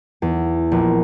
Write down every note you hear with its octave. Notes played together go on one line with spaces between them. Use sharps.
E2
A#1